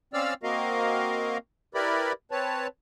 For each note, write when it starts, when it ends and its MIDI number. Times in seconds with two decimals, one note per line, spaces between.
0.14 0.34 60
0.14 0.34 61
0.14 0.34 74
0.14 0.34 77
0.14 0.34 88
0.14 0.34 89
0.43 1.37 58
0.43 1.37 60
0.43 1.37 66
0.43 1.37 70
0.43 1.37 75
0.43 1.37 77
1.75 2.12 64
1.75 2.12 67
1.75 2.12 70
1.75 2.12 71
1.75 2.12 74
1.75 2.12 83
2.31 2.67 60
2.31 2.67 71
2.31 2.67 73
2.31 2.67 81